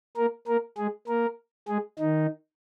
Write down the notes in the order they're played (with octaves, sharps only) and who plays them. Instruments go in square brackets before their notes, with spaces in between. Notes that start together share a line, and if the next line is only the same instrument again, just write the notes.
[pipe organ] A#3 A#4
A#3 A#4
G#3 G#4
A#3 A#4
G#3 G#4
D#3 D#4